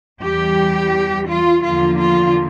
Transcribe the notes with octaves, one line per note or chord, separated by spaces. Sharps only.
E2 E3 G3 G4
F4
E2 D3 F3 A#3 F4
F4